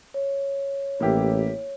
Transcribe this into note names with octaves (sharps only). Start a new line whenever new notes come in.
C#5
A1 A#3 E4 G4